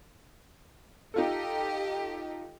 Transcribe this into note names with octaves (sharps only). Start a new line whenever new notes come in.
D#4 F4 G4 A4 D#5